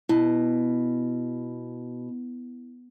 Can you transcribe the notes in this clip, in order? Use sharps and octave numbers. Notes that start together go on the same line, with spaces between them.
B2 E4